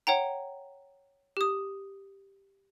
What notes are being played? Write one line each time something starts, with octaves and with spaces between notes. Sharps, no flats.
C#5 F#5 G5 A#5
G4 D#6